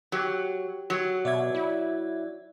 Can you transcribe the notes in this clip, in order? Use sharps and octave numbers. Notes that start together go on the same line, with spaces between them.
F#3 G4
F#3
B2 D5 E5 G#6
E4